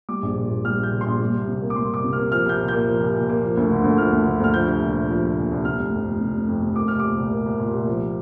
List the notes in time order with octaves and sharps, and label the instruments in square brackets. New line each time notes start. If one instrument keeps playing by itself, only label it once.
[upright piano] G3 D6
A#1
A#2
A#1
G3 F6
A#1
G6
A#2
C6
A#1
G3
C2
C3
A#3
D6
G3 C6
C2 D6
C3
F6
A#3
F3 F6
C2 G6
A#2
A#3 G6
F3
C2
A#2
A#3
F3
D2
D3
D2
F3 F6
D2
D3
D2 F6
F3 G6
C2
A#2
C2
F3
C2
A#2
C2
C3 F6
F1
F2
F1
C3
F1
F2
F1
A#3 D6
C2 F6
A#2 D6
C2
A#3
C2
A#2
C2
F3